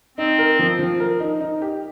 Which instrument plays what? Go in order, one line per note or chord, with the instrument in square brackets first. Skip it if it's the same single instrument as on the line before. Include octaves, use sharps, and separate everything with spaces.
[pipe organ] C4 [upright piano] D#4
[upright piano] A#4
F3
F3
A#4
D#4
D#4
G4